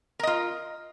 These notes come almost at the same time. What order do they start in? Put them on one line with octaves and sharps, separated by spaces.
A#4 D#5 F4